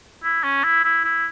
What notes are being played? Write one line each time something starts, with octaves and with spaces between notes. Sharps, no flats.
E4
C#4
E4
E4
E4